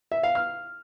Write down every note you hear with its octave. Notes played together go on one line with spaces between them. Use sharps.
E5
F5
F6